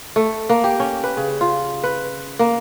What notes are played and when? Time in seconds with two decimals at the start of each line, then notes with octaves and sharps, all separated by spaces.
0.16 A3
0.49 A#3
0.64 G4
0.80 C#4
1.04 B4
1.17 C#3
1.41 F4
1.84 B4
2.39 A#3